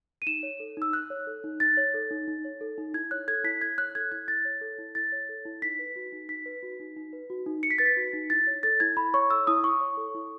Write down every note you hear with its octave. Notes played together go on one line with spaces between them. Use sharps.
D#7
D#4 E7
C#5
A4
D#4 E6
D#4 F#6
C#5
A4
D#4
D#4 A6
C#5
A4
D#4
D#4
C#5
A4
D#4
E4 G#6
C#5 F#6
A4 G#6
E4 B6
E4 G#6
C#5 F#6
A4 G#6
E4 G#6
E4 A6
C#5
A4
E4
E4 A6
C#5
A4
E4
D#4 B6
B4
F#4
D#4
D#4 B6
B4
F#4
D#4
D#4
B4
F#4
D#4
D#4 C#7
B6
B4 A6
B6
F#4
D#4
E4 A6
C#5
A4 A6
E4 G#6
E4 B5
C#5 C#6
A4 E6
E4 D#6
E4 C#6
C#5
A4
E4